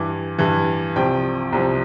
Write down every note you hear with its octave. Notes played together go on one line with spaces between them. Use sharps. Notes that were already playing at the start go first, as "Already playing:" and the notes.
Already playing: G2 E3 D6
G2 E3
C2 C3 F3 G5
C2 C3 F3